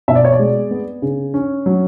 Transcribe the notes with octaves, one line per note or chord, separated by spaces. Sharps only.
B2 E5
D5
C#5
D5
G#3
B3
C#3
C#4
F#3